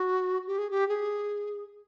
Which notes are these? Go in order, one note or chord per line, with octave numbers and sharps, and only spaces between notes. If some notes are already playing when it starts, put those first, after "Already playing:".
Already playing: F#4
G4
G#4
G4
G#4